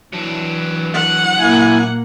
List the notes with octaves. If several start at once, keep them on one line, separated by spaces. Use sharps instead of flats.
E3 F#3 D4
F#5
A#2 A#3 E4 G#5